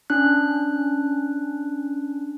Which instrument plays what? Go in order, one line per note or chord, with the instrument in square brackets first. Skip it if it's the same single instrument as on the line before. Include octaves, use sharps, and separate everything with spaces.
[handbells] C#4 D4 F#6